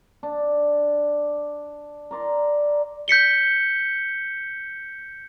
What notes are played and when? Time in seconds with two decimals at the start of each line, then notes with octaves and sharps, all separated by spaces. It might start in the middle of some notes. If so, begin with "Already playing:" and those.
0.23 D4
2.11 A#4 D5 C6
3.08 G6 B6 C#7 G7